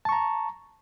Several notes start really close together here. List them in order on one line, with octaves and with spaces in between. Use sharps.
A5 C#6 A#5